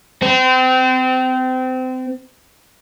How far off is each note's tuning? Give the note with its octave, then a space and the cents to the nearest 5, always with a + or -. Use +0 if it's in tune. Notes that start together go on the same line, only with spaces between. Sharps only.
C4 -30